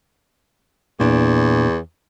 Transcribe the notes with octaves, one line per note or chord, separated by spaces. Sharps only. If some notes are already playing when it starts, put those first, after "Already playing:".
E2 A#2 D4